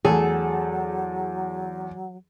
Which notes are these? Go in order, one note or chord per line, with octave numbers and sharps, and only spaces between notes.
E2 F#3 A3 G#4 A4